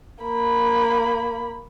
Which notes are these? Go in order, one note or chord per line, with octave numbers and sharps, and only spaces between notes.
A#3 B5